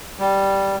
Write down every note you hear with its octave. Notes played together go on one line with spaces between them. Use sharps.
G3